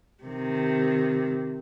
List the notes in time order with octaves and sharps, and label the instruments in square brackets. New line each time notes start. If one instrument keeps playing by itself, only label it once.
[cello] C3 D#3